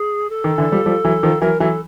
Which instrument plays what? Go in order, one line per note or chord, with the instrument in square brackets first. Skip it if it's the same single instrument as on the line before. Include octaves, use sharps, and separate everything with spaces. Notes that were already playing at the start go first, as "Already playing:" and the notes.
Already playing: [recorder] G#4
A4
[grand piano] D#3
D3 E3
F3 G3
F3 G3
E3 F#3
D#3 F3
[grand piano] E3 F#3 [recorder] A#4
[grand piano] E3 F#3 [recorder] A4